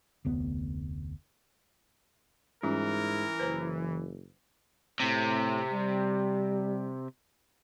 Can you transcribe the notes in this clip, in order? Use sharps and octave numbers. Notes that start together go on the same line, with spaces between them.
F1 D2 B3
G#2 E3 G3 C#4 F4 A#4
F#1 B4 C5 A#5
A2 C3
G3